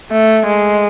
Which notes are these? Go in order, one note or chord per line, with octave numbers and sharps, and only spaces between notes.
A3
G#3